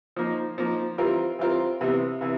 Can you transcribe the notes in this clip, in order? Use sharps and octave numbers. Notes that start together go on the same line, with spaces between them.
F3 A#3 D#4
F3 A#3 D#4
E3 G3 C4 F4 A#4
E3 G3 C4 F4 A#4
C3 E3 G3 B3
C3 E3